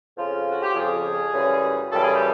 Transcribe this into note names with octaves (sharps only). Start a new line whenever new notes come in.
F2 C#3 F3 F4
F#4
G4
F2 C#3 F3 G#4
F#2 C#3 E3 G3
F#2 C#3 E3 G3 A4
G#4
G4